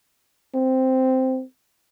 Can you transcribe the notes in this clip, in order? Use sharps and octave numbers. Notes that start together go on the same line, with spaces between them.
C4